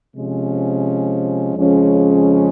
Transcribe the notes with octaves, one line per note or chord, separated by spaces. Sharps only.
C3 F3 G#3 C#4
F2 C#3 F3 G#3 C#4